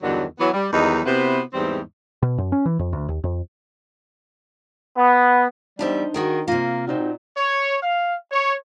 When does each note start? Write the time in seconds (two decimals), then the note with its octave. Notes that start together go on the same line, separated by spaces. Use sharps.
0.02 E2 G2 D3 D#3 F#3
0.40 E3 F#3 B3
0.53 G3
0.73 E2 D#3 F#3 G3 D#4
1.05 C3 B3 E4 F#4 B4 C5
1.54 E2 G#2 E3 G3 C4
2.23 B2
2.38 F#2
2.52 C#4
2.66 E3
2.79 F2
2.93 D2
3.09 D#2
3.24 F2
4.97 B3
5.79 E2 G3 D4 D#4 G4 C5 E5
6.14 D#3 F#4 G#4 A#4
6.48 C3 A#3 F4
6.87 A#2 C4 D#4 F#4
7.37 C#5
7.83 F5
8.32 C#5